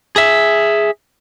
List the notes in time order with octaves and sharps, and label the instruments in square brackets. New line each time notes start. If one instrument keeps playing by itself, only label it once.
[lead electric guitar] G#4 E5